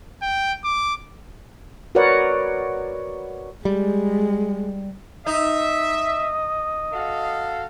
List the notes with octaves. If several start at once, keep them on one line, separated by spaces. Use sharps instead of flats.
G5
D6
F#4 A#4 B4 C#5 D5 F#5
G3 G#3
D#4 D#5 E5
F#4 A4 F5